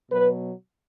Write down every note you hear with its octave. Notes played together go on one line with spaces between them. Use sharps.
B2 F#3 B4